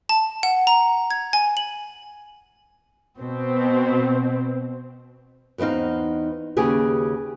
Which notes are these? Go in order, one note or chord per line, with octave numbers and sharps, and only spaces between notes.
A5
F#5
A#5
G#6
G#5
F#7
B2 C4
E2 B3 C4 D#4 F5
D#2 C#3 G4 G#4 B4